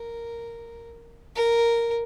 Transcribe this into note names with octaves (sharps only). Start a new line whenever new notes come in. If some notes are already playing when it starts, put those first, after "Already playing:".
Already playing: A#4
A#4